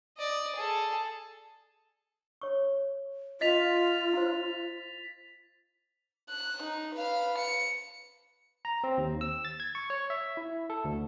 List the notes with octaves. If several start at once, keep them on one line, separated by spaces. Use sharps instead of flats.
D5 D#5
G#4 A4
C#5 C#6
F4 D#5 A6 B6 F7
E4 C5
F#6
D#4
B4 F5
C#7
A#5
C4
D#2
E6
A6
G#6
C#6
C#5
E5
E4
A4
D2